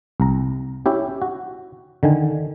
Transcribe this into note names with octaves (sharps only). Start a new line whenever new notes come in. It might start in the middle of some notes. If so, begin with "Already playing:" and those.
C2 A#5
C#4 E4 G4
F#4
D3 D#3 G#5